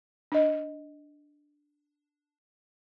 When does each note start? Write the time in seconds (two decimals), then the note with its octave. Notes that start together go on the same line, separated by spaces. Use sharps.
0.32 D4 D#5